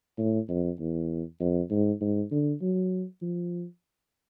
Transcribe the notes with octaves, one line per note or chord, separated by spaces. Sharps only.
A2
F2
E2
F2
G#2
G#2
D3
F#3
F3